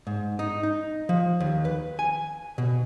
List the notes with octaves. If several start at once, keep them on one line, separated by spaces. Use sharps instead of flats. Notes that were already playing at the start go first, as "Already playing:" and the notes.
G#2
D#4
D#4
F3
D#2
B4
G#5
B2